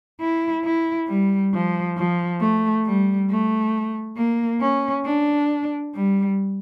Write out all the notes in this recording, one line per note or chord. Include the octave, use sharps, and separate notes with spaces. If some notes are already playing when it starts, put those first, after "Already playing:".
E4
E4
G3
F3
F3
A3
G3
A3
A#3
C#4
D4
G3